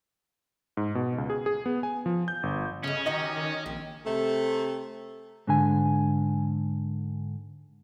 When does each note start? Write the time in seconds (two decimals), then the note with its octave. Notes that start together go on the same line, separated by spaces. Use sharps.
0.77 G#2
0.95 B2
1.18 C#2
1.30 G#4
1.46 G#4
1.66 B3
1.83 G#5
2.06 F3
2.28 G6
2.43 G1
2.84 C#3 G#3 A3 C#4
3.06 D#3 F#4 G4 A#4 D#5
3.66 A#1 C4
4.05 C3 A3
5.47 G#2 D3 G#5